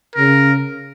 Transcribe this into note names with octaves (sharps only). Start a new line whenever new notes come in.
C#3 A#4